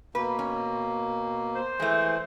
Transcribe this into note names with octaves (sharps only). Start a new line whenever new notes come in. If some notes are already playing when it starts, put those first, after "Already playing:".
B2 A#3 B4
C#4
C5
E3 G#3 A3